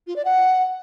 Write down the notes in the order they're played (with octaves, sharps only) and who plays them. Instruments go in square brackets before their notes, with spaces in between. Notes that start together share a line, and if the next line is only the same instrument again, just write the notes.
[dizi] F4
D5
F#5